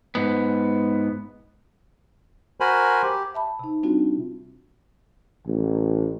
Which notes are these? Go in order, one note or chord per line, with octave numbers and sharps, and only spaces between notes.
G#2 B3
F#4 A#4 C5 G#5 B5
G4
E5 A5 B5
C3 D#4
G3 C4 D4 D#4 F4 F#4
A1